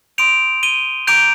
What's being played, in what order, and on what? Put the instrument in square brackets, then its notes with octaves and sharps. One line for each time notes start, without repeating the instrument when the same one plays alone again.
[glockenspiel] C6 D#6 G6 D7 F7
D#7 G7
A#5 D6 G6 D7 F7